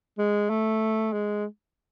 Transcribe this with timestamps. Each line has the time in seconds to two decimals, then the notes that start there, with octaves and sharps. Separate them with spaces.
0.18 G#3
0.50 A3
1.13 G#3